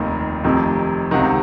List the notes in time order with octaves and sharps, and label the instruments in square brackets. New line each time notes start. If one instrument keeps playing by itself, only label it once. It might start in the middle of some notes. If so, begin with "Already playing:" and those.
Already playing: [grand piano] F1 D#2 D#3
F1 F2 C3 D#3
C#2 C3 D#3 F#5